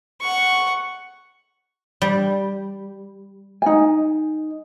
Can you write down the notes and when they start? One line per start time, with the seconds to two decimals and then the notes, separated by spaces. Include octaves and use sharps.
0.21 F#5 C#6
2.02 G3
3.62 D#4 G#5